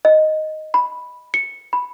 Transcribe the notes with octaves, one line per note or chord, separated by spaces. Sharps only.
D#5
B5
C#7
B5